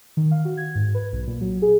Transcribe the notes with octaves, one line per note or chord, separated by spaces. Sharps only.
D#3
F5
F#4
G#6
G#2
B4
B1
A#2
F#3
G#4